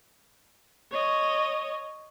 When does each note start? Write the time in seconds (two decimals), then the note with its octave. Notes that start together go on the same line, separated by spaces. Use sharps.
0.91 C#5 D#5